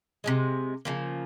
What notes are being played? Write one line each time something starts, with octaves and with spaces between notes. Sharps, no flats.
C3 F3 G#3
C#3 F3 A#3